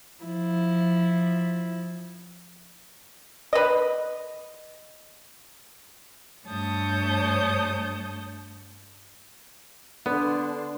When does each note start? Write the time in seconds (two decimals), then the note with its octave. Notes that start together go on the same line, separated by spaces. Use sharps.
0.24 F3 E4
3.53 B4 D#5
6.47 G2 A3 C#5 A5 D#6 G6
10.06 D3 B3 D4 C6